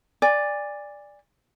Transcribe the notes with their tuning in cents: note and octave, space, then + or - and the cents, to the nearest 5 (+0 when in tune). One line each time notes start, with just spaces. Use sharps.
D5 +0 G#5 -30